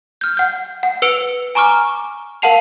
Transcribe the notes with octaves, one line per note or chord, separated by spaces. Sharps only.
F6 G6
F#5 G6
F#5
B4 E6 C#7 D7 F7
G#5 A#5 C#6 D6 F6
A#4 F5 F#5 A5 C7 F7